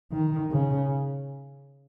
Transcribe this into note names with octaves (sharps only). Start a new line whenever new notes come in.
D#3
C#3